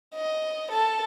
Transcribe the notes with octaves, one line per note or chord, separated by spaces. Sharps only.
D#5
A4 A5